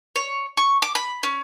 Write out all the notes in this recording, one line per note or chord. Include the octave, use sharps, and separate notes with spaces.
C#5
C#6
D6
B5
C#4